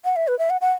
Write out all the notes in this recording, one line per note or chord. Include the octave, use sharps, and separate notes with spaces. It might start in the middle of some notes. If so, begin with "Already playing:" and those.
F#5
E5
B4
E5
F#5
F#5